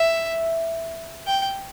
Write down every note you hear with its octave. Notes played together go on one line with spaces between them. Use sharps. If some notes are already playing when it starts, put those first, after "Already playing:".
Already playing: E5
G5